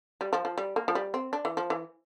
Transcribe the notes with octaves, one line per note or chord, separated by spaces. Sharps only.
G3
F3
F3
G3
A#3
F3
G3
C4
D4
E3
F3
E3